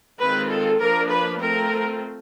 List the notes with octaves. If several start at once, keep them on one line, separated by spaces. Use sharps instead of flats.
D#3 G#3 C4 F4 B4
A4
F3 A#3 D4 F4 A#4
B4
A3 C4 F4 A#4